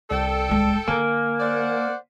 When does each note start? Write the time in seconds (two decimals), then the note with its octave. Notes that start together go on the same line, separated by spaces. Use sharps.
0.11 C2 A4 D5 G5
0.49 D1 G#3
0.88 D3 A#3 A#4 G#5
1.40 C5 D5 F#5